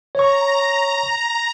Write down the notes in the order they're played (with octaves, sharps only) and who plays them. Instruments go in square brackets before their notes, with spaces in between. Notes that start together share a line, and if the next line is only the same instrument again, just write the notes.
[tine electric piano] C#5 C#6 [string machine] A#5